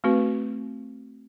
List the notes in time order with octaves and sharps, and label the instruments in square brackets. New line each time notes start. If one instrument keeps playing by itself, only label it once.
[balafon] A3 C4 F#4 B4